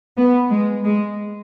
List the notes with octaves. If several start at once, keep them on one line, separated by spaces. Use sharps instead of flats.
B3
G#3
G#3